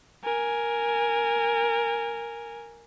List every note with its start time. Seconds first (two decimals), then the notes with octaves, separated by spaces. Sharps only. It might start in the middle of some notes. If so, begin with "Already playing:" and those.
0.24 A#4 G#5